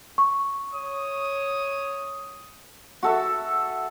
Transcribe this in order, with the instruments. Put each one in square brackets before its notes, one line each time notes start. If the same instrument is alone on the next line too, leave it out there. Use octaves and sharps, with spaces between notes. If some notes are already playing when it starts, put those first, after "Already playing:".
[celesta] C#6
[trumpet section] C#5 D#6
[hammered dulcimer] F#4 A4 E5